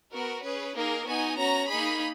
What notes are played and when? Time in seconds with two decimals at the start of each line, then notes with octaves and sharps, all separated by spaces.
0.12 B3 F#4 A#4
0.43 C#4 G#4 B4
0.75 A#3 D#4 G#4 A#4
1.07 B3 D#4 F#4 G#5
1.37 C#4 F#4 A#5
1.69 A#3 D#4 G#4 B5